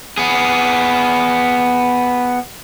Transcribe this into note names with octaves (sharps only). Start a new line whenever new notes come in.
B3 G#4